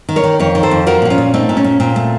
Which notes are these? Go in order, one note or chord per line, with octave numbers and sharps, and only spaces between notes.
D#3
A#4 C#5
D#3
F2 A#4 C#5
D#3
A4 C5
F2
F3 F#4 A#4
A#2 F#4
C#4 F4
A#2
A3 C4 D#4
A#2
C#4
A#2
A#2 C4
A3